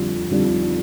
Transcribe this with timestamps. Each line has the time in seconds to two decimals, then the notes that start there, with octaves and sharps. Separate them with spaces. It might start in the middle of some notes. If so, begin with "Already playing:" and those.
Already playing: F2 D3 G3 D4 F4
0.31 F2 D3 G3 D4 F4